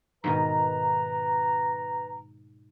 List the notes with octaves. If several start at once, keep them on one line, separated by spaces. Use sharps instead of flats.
G#2 B2 D#3 B4 A#5